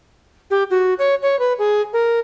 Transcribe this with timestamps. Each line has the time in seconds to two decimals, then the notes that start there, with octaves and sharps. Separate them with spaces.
0.51 G4
0.70 F#4
0.99 C#5
1.22 C#5
1.39 B4
1.59 G#4
1.93 A#4